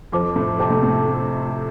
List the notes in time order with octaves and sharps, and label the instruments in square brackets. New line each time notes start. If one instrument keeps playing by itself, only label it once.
[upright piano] F2 F3 [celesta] C5 A5 D6
[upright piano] A2 A3
[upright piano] C3 C4 [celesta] C5 A5 D6
[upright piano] A2 A3
A2 A3